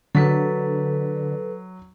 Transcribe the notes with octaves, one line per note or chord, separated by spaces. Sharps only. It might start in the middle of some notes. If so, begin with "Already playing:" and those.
D3 F#3 A4 B4 B6